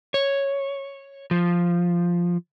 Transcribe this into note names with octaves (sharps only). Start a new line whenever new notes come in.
C#5
F3